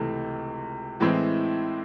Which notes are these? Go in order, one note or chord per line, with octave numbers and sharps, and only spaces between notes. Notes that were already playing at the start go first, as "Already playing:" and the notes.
Already playing: C#2 C3 E3 A3
A2 E3 G#3 C4 E4